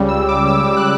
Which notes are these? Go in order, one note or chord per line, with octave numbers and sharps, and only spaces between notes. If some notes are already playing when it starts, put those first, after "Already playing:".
Already playing: C#2 C#3 G3
E6
D6
E6
E6
E6
F#6